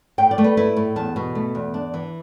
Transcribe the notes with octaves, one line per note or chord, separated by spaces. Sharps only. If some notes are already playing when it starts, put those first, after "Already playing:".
A2 G5
D5
A3
B4
E4 B4
A2
E2 A5
B2
A3
E2
D4
E3